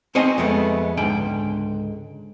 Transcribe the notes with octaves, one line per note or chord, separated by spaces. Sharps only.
C4 D#4 C5 C#5 D#5 G#5
F2 G#3 A3 B3
C#2 G#2 D3 G5